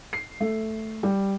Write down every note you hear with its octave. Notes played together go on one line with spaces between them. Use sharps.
C7
A3
G3